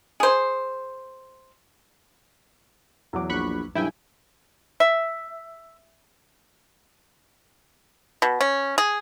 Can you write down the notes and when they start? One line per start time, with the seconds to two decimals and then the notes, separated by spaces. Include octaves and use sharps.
0.20 G#4 C5
3.13 E2 F#3 D6
3.30 A#1 B5 C#6 F#6
3.75 B1 G2 E4 G5 G#5
4.80 E5
8.22 B2
8.41 C#4
8.78 G#4